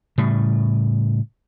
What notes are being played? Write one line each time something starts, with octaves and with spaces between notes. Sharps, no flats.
A2 C#3 G3